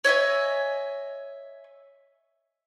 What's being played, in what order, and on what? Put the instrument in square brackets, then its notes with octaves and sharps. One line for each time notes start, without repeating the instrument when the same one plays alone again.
[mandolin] C#5 D#5 E5 G#5